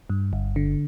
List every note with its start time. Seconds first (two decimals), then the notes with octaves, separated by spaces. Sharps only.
0.10 G2
0.33 G1
0.56 D3